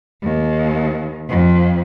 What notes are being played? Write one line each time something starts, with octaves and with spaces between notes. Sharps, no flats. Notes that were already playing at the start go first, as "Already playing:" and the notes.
D#2
F2